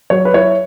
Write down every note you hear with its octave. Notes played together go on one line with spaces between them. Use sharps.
F#3 C#5
B4
E4 C#5